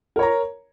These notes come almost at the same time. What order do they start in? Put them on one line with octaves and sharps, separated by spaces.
A#4 C#5 A#5